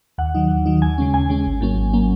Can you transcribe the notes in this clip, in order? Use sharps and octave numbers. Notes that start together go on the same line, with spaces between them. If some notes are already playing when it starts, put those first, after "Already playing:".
D#2 F#5
D#3 F#3 D#4
D#2
D#3 F#3 D#4
D#2 G#5
C#3 G#3 C#4
D#2 G#5
C#3 G#3 C#4
G#1
G#2 F#3 A#3 C#4
G#1
F#3 A#3 C#4